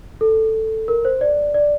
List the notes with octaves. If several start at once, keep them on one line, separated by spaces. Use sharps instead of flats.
A4
A#4
C5
D5
D5